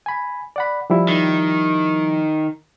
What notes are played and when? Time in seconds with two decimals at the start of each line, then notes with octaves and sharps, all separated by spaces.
0.06 G#5 B5
0.56 D5 F#5 B5
0.90 F3 G3 E4
1.08 D#3